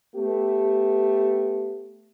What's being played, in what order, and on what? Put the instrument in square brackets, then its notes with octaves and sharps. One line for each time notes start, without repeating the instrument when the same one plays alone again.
[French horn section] A3 B3 G4